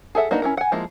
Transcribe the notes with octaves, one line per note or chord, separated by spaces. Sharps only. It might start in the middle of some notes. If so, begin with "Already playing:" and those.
G#4 A4 E5 F#5
A#3 D4 D#4 F#4 B4
C#4 E4 A#4
F#5 G#5
F3 G#3 A#3 E4